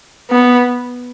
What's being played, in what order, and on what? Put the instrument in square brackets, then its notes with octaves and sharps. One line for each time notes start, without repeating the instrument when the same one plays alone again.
[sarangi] B3